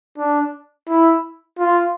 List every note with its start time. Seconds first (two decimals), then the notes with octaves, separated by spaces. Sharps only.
0.18 D4
0.89 E4
1.59 F4